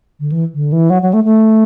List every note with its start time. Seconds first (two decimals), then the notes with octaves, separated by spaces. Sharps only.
0.20 D3
0.32 E3
0.54 D3
0.72 E3
0.90 F#3
1.02 F#3
1.13 A3
1.24 A3